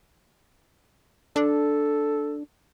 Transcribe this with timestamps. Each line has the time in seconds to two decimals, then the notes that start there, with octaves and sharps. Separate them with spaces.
1.36 D4 A4